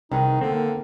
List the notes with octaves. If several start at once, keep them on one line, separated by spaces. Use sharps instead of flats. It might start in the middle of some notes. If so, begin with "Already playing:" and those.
C2 D#3 D#4 G#4 B4
D3 A#3 C4